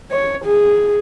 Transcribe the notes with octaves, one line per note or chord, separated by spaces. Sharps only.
C#5
G#4